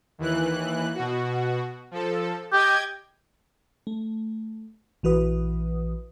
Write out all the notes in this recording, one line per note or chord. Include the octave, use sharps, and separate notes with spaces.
D#2 E3 F#6
B2 F#4
F3 A4
G4 D#5 G5 G#6
A3
A#1 E3 F#4 B4 D#6